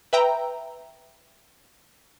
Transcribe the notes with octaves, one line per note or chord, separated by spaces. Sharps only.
B4 E5 G5 A#5